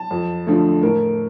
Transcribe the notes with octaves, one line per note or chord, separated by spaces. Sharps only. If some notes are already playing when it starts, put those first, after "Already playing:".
Already playing: A5
F2
D3 F3 A3
A2 A#4